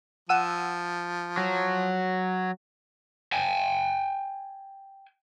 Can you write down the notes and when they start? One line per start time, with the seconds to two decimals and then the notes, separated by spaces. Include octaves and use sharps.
0.29 F3 F#5 E6 D#7
1.37 F#3
3.32 G5 G#5